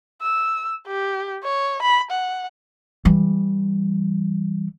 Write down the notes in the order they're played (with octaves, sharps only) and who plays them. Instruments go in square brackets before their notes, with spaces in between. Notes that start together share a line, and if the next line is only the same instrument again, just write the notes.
[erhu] E6
G4
C#5
B5
F#5
[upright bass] E3 G3